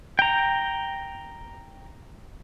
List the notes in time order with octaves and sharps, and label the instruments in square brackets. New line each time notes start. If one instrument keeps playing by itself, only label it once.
[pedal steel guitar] G5 A#5